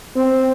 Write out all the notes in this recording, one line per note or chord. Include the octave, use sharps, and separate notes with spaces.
C4